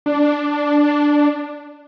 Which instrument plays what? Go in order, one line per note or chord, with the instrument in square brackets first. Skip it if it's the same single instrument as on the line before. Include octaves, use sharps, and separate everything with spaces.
[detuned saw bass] D4